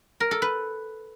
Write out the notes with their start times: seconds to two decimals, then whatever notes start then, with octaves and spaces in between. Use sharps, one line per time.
0.20 A#4
0.31 A4
0.42 B4